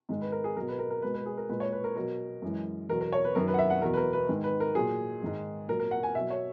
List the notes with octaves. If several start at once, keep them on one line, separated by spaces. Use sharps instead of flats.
G#2 D#3 G#3
B4
A#4
G#4
B2 F#3 A#4
B4
A#4
A#4
B2 G#3 B4
B4
G#4
A#4
A#2 G#3 B4
C#5
B4
A#4
B2 F#3 A#4
F#2 E3 G#3
E2 B2 F#3 A#4
A#4
C#5
B4
F#2 D#3 F#3 A#4
B4
F#5
E5
F#5
E2 B2 F#3 A#4
B4
A#4
B4
G#2 D#3 G#3
B4
A#4
A#2 F#3 G#4
G#2 D#3 G#3
A#2 F#3 A#4
A#4
F#5
G#5
B2 F#3 E5
C#5